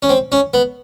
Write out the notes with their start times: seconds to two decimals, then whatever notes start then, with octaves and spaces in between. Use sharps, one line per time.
0.03 C#4
0.09 C4
0.32 C#4
0.54 B3